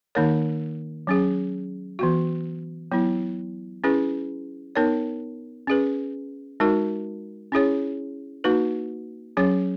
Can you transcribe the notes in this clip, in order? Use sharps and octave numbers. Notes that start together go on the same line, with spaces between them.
D#3 A#3 D#4 A#4 C#5
F#3 C#4 G#4
E3 B3 F#4
F#3 B3 E4
C#4 E4 G#4 B4
B3 D#4 A#4 C#5
C#4 G#4 B4
G#3 D#4 F#4 A#4
C#4 E4 G#4 C#5
A#3 D#4 F#4 B4
F#3 C#4 G#4 C#5